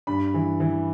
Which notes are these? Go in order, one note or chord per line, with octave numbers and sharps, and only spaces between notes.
G2 B5
E3
E3